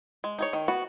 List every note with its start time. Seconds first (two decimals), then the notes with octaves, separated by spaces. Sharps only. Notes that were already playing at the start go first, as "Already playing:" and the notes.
0.24 G#3
0.39 D#4 G#4 C#5
0.53 D#3
0.68 B3 F#4